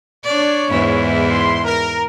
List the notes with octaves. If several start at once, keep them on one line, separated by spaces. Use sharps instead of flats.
D4 C#5 D5
E2 G#2 E4
C6
A#4